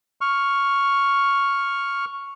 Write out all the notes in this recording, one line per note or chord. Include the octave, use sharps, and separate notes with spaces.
C#6 F6